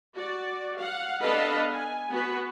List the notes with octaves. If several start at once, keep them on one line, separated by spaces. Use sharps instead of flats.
F#4 D5
F5 F#5
B3 D4 A4 B4 D#5 F5
G#5
B3 F#4 B4